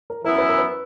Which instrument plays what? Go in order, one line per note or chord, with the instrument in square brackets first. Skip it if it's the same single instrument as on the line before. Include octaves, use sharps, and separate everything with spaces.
[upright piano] A#4
[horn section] F#2 E3 B3 E4 [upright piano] A#4
[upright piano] B4
A#4
B4